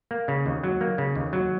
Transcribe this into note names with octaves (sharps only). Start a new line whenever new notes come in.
A#3
C#3
D#2
F#3
A#3
C#3
D#2
F#3